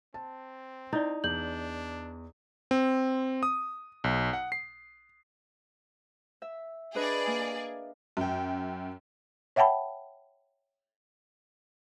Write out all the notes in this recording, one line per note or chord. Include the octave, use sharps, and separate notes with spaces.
C4 A5
D#4 E4 D5
E2 D4 G6 F#7
C4
D#6
B1
F#5
C7
E5
D4 G#4 B4 D5 D#5
A#3
F#2 G5
C#5 E5 F#5 G5 A5 B5